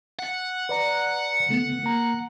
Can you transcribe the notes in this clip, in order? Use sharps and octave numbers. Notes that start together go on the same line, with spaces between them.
F#5
B4 D5 A#5
C#3 A3 B3
A#3 A#5